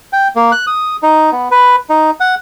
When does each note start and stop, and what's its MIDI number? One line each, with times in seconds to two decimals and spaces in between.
0.13 0.28 79
0.36 0.52 58
0.52 0.66 90
0.67 0.96 87
1.03 1.30 63
1.32 1.48 59
1.51 1.76 71
1.90 2.11 63
2.20 2.35 78